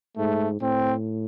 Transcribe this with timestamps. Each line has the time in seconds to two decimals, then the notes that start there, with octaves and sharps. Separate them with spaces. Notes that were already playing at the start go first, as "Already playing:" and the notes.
0.17 G#2 A3
0.61 A2 C4